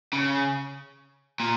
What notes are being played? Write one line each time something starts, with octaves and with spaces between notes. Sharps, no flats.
C#3
A#2